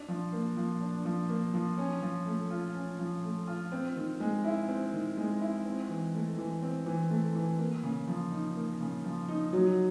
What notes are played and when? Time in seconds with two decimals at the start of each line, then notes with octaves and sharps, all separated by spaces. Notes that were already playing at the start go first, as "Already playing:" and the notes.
Already playing: D4
0.08 F3
0.33 A#3
0.57 F3
0.81 D4
1.05 F3
1.29 A#3
1.54 F3
1.78 C#4
2.02 F3
2.26 A3
2.50 F4
2.75 C#4
2.99 F3
3.23 A3
3.47 F4
3.72 C4
3.96 D#3
4.20 G#3
4.44 E4
4.68 C4
4.92 D#3
5.17 G#3
5.41 E4
5.65 C4
5.89 E3
6.14 A3
6.38 E3
6.62 C4
6.86 E3
7.10 A3
7.35 E3
7.58 A#3
7.83 C#3
8.08 F3
8.31 D#4
8.56 A#3
8.80 C#3
9.04 F3
9.28 D#4
9.53 F#3